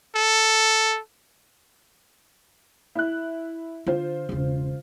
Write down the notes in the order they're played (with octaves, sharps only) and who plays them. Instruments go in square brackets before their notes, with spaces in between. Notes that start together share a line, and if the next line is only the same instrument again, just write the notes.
[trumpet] A4
[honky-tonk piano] E4 F#6
[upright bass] D3 [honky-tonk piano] F4 C5
[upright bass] E1 C#3